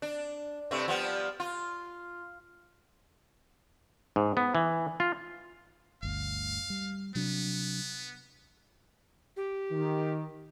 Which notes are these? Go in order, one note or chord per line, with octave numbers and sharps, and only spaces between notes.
D4
G2 C3 A3
F3 G3 B3
F4
G#2
B3
E3
F4
G1 D2 F5
G3
C3 F#3 B3 D4
G4
D#3